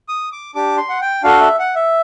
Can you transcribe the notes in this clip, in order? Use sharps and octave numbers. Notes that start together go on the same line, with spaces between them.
D#6
D6
D4 G4 D6
C6
F#5
G5
D4 F#4 A4 F5
E5
F#5
E5